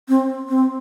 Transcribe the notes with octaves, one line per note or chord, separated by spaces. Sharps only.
C4
C4